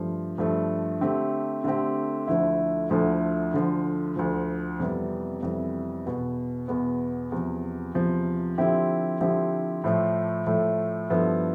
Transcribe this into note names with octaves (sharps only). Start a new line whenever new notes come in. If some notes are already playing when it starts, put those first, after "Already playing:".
Already playing: G2 F3 A3
G2 F3 A3
D3 A3 C4 G4
D3 A3 C4 G4
D2 D3 F3 A3 E4
D2 D3 F3 A3 E4
D2 D3 F3
D2 D3 F3
F2 C3 E3 G3 B3
F2 C3 E3 G3 B3
E2 B2 B3
E2 B2 B3
E2 C3 F3
E2 C3 F3
D3 F3 C4 E4 G4
D3 F3 C4 E4 G4
A2 F3 A3
A2 F3 A3
G2 F3 B3 E4 A4